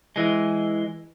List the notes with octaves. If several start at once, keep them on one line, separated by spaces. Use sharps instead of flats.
E3 G#3